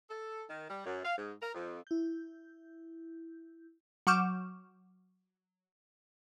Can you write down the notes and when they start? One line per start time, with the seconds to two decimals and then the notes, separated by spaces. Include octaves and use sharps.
0.10 A4
0.50 D#3
0.69 G3
0.85 F#2
1.03 F5
1.17 G#2
1.42 A#4
1.54 F2
1.87 E4 G6
4.07 F#3 C#6 D6 F6 G6 E7